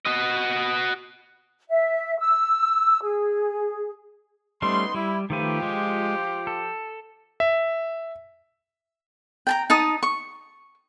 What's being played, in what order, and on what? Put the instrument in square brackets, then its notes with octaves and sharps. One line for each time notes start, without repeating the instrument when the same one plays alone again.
[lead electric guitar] F#4 D#5
[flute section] E5
E6
G#4
[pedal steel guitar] G3 A3 C#4 [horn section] B3 D#4 C6
[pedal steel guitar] G3 [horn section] E4
[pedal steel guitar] D#3 A3 B4 [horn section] F3 F4 G4
[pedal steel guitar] G#3
A4
[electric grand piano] E5
[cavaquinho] G5 A5 A#5
D#4 A5 D#6
C#6